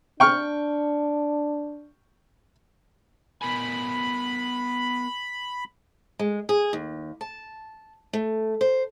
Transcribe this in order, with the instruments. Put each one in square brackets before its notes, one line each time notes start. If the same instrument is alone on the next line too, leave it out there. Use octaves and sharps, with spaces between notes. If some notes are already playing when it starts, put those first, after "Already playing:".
[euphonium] D4 [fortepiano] G5 C#6 F6
[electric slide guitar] B3 A#4 G#5 [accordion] B5
[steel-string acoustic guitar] G#3
G#4
D#2
A5
A3
C5